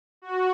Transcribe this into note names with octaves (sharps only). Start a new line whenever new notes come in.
F#4